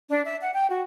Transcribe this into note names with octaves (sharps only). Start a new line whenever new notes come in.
D4
E5
F#5
G5
F#4